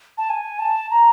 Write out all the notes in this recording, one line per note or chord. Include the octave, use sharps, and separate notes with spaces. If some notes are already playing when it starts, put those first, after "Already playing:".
A5
G#5
A5
A#5